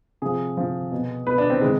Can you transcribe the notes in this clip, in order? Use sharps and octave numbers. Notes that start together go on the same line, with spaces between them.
C3 F3 G#4
C3 F3
B2
B2 B4
D4
C4
C3 D#3 G#3